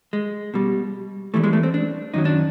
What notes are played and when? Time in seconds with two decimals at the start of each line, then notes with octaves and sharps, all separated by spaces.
0.13 G#3
0.54 B2 G3
1.34 E2 C3 E3 G3 A3
1.43 G#3
1.53 A3
1.63 C4
1.74 D4
2.14 F#2 D#3 F#3 D#4
2.25 D4